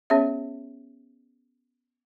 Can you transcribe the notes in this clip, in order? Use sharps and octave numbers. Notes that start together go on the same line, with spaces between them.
B3 C#4 G#4 C#5 E5